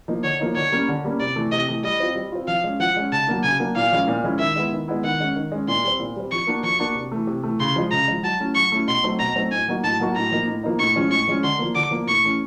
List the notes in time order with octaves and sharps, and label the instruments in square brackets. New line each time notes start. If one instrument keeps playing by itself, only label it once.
[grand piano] F3 A#3 D#4
[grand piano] D3 [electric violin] C#5
[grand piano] F3 A#3 D#4
[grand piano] D3 [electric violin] C#5
[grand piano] G3 A#3 C#4
D3
G3 A#3 C#4
[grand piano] C3 [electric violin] D5
[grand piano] E3 A3
[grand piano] C3 [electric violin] D#5
[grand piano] E3 A3
[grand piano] G3 [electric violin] D#5
[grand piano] C4 F4
G3
C4 F4
[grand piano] F3 [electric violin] F5
[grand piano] G#3 C#4
[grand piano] F3 [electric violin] F#5
[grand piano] G#3 C#4
[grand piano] C#3 [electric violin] A5
[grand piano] F#3 A#3 D4
[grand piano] C#3 [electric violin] G#5
[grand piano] F#3 A#3 D4
[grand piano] A#2 [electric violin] F5
[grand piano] F3 G#3 C#4 E4
A#2
F3 G#3 C#4 E4
[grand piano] D#3 [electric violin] E5
[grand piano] G#3 B3 E4
D#3
G#3 B3 E4
[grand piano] D#3 [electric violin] F#5
[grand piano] G#3 C#4
D#3
G#3 C#4
[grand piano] A#2 [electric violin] C6
[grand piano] G3 C4
A#2
G3 C4
[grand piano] F3 [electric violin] C#6
[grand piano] A#3 D4 F#4
[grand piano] F3 [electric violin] C#6
[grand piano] A#3 D4 F#4
C3
E3 A3
C3
E3 A3
[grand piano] C#3 [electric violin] C6
[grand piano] F3 G#3
[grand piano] C#3 [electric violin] A#5
[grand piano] F3 G#3
[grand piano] F#3 [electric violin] A5
[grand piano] A3 C#4 E4
[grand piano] F#3 [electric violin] C#6
[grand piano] A3 C#4 E4
[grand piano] B2 [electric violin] C6
[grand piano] F#3 A3 C4 D#4
[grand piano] B2 [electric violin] A#5
[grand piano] F#3 A3 C4 D#4
[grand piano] A2 [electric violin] G#5
[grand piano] F#3 A#3 D#4 F#4
[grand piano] A2 [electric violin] A5
[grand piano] F#3 A#3 D#4 F#4
[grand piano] A2 [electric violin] A#5
[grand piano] F3 A#3 D#4
A2
F3 A#3 D#4
[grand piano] A2 [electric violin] C#6
[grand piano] F3 G#3 C#4
[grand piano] A2 [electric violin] C#6
[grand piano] F3 G#3 C#4
[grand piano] D3 [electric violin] C6
[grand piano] F3 A#3
[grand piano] D3 [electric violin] D6
[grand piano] F3 A#3
[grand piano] A2 [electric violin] C#6
[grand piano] E3 A3 C#4